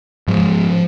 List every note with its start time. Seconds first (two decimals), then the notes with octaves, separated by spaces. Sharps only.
0.28 G#2 F3